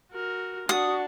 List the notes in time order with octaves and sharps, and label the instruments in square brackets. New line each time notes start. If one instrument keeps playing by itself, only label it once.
[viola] F#4 A#4
[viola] D4 [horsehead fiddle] F#4 [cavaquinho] D#6